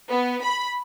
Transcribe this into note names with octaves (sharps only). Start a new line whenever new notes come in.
B3
B5